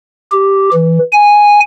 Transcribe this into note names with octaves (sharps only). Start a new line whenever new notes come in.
G4
E3
G#5